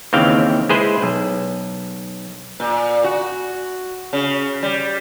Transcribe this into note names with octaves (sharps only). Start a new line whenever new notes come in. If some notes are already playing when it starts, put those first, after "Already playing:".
D#2 C#3 E3 C4 F5 G5
G#3 E4 G#4 B4 C5
B1
A#2
F#4
C#3
G3